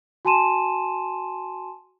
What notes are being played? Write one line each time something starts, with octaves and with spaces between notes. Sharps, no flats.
F#4 G#5 A5 C6 D#7 E7